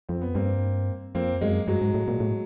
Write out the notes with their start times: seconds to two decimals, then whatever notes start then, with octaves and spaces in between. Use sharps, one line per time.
0.09 F2 C4
0.21 B3
0.35 G2 A#3 C4
1.15 F2 A#3 C4
1.41 F#2 G#3 A#3
1.67 G2 F#3 G#3
1.81 G#2
1.94 A2
2.08 A#2
2.20 A2